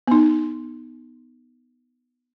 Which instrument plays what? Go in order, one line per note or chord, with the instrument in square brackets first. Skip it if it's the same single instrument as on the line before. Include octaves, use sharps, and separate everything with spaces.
[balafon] B3 D#4